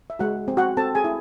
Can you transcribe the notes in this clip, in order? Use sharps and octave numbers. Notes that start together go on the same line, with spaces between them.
E5
G#3 F#4 F#5
C4
F#4 F#5
C4 A4 A5
G#4 G#5
E4